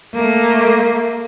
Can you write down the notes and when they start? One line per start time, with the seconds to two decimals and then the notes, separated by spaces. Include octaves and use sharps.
0.14 A3 A#3